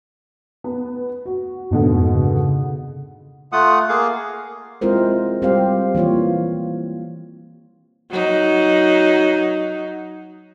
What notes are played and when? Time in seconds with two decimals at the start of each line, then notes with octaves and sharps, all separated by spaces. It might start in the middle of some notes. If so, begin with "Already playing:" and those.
0.64 B3
1.25 F#4
1.71 G#1 F2 B2 D3
2.14 C#3
3.52 A3 F4 F#5 D#6
3.89 A#3 G#4 F5
4.81 G#3 C4 E4 F4 A#4 C5
5.42 G3 C4 G4 C5 F5
5.95 E3 A#3 F4 C#5
8.11 F#3 D#4